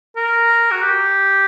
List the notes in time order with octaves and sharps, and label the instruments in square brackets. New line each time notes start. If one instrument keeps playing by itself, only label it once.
[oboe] A#4
F#4
G4